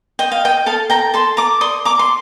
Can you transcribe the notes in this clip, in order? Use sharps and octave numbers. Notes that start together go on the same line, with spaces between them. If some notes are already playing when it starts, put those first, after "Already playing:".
D#5 G5
F5
D#5 G5
A4 F5 A5
G5 A#5
A4 A5 C6
A#5 D6
D5 C6 D#6
A#5 D6
C6